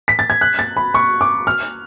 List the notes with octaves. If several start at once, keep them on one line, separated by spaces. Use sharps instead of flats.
B6
A6
G#6
F#6
A6
B5
C#6
D6
F6